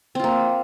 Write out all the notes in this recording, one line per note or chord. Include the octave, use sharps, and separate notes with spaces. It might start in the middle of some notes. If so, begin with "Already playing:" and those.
A#3 C4 F4